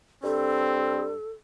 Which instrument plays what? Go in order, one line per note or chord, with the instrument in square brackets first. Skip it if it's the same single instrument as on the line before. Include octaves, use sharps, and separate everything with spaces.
[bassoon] G2 [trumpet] C4 [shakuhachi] A4